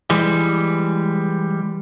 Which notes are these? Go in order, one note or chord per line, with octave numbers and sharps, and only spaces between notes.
E3 G3 G#3